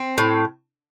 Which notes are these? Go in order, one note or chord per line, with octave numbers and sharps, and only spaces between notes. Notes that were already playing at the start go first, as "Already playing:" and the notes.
Already playing: C4
A2